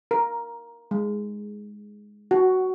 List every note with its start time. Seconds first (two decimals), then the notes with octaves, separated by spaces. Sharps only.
0.11 A#4
0.91 G#3
2.31 F#4